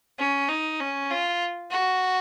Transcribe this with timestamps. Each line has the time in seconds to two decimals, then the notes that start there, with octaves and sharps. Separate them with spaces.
0.19 C#4
0.49 D#4
0.80 C#4
1.11 F4
1.71 F#4